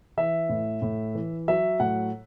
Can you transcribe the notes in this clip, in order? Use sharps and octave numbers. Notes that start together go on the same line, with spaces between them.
E3 E5
A2
A2
E3
F#3 E5
A2 F#5